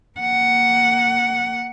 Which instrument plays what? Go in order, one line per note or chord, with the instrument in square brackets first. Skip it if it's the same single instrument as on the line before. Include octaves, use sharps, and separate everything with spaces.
[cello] A#3 F#5